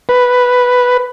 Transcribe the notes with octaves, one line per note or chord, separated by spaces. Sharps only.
B4